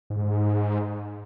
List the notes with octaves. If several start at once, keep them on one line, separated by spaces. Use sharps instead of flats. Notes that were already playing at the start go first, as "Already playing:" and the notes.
G#2